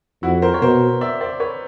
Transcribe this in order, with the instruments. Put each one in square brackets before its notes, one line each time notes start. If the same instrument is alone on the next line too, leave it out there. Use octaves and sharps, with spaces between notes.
[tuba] F2 [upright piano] E4 F#4
[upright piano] A#4 C5
C#5
[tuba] B2 [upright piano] A#4 C5
[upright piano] D5 E5
C5 D5
B4 C#5